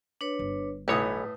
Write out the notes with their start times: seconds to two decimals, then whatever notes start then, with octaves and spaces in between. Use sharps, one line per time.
0.21 D4 B4 C#5
0.39 G1
0.88 B1 A2 E3 B4 C#5 D#6